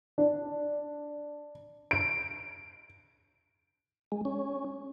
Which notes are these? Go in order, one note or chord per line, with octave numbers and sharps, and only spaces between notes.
D4
D7
G#3
C#4